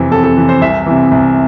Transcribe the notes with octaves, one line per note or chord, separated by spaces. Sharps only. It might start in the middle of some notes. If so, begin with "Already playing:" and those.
Already playing: F2 C3 E3
F2 A4
A4
C3 E3
C5
C2 E5
C3 E3
C2